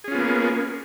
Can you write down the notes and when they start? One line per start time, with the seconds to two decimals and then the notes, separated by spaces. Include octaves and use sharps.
0.04 G#4
0.08 C#4
0.11 F4
0.15 B3
0.18 A#3